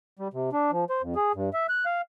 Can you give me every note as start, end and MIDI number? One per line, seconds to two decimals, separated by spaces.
0.19 0.28 55
0.33 0.50 48
0.53 0.71 62
0.72 0.85 53
0.90 1.02 72
1.02 1.15 41
1.16 1.32 68
1.35 1.50 43
1.54 1.67 76
1.69 1.85 90
1.86 2.01 77